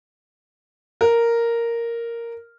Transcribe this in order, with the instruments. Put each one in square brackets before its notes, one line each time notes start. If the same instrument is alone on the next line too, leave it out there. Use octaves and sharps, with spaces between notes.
[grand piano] A#4